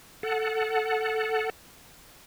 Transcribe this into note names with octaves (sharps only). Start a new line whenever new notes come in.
A4 F#5